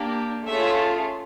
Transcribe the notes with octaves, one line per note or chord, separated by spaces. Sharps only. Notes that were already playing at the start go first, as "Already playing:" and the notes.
Already playing: A#3 D4 G4
A3 C#4 F4 G#4 E5